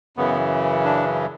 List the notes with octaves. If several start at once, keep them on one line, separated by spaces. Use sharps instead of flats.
F#2 C#3 E3 B3
D4